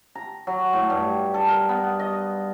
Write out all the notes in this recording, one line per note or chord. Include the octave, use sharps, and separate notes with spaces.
A#5
F#3
A2
G2
A4
A#4
B3
D#5